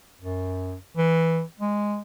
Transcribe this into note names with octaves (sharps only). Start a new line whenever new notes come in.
F#2
E3
G#3